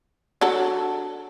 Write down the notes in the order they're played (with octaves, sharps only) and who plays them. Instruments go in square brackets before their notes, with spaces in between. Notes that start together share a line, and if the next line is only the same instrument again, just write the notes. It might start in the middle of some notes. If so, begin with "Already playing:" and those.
[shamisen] F#3 D4 A4